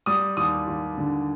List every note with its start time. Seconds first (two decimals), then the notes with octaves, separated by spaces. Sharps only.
0.06 G3 D#6
0.37 D#2 D#6
0.67 D#2
0.98 D3